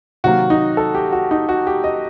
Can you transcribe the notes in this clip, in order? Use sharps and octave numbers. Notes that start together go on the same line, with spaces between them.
C3 D#3 F#3 A#3 F#4
D#4
A4
G4
F#4
D#4
F#4
G4
D#5